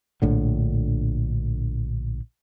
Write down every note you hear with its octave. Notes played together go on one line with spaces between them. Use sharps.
A#1 A2 D3